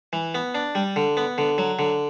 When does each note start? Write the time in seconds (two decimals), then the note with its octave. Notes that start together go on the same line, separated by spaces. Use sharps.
0.13 E3
0.35 B3
0.55 D4
0.75 G3
0.96 D3
1.17 B3
1.38 D3
1.58 F#3
1.79 D3